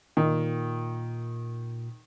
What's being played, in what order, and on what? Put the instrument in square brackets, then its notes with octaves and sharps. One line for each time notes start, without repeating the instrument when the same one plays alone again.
[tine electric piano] A#2 [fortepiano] D#3